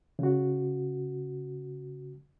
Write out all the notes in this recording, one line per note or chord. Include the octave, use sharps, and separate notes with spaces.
C#3 F#4